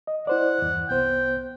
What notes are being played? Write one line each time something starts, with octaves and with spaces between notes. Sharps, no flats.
D#5
E4 C5 D5 F#5
E2 G2
C2 B3 C5 G5